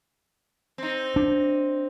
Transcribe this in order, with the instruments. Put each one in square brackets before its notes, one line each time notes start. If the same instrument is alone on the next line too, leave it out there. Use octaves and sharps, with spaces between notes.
[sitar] C4 D#4
[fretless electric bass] D4